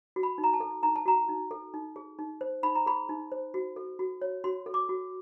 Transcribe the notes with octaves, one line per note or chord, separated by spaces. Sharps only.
F#4
B5
D#4
A#5
A5
A4
D#4 A#5
A5
F#4 A#5
D#4
A4
D#4
G#4
D#4
C5
D#4 B5
A#5
G#4 B5
D#4
C5
F#4
A4
F#4
C#5
F#4 C6
A4
D6
F#4